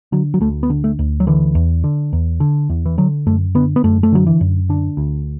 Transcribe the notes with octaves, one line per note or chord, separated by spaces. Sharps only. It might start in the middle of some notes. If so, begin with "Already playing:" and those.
D3 F#3
F#3
D2 A3
B3
D3
A3
D2
F#3
D3 E3
E2
D3
E2
D3
E2
E3
D3 F#3
F#2 A3
D3 B3
B3
F#2 A3
A3
D3 F#3
E3
F#2
D3 D4
D2